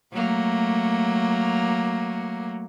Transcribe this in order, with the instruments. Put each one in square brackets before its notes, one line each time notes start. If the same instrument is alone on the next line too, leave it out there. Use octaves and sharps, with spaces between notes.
[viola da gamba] F#3 A3 A#3